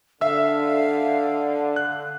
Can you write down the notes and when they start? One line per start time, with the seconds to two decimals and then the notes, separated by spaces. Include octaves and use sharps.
0.21 D3 E5 F5 E6
1.76 F#6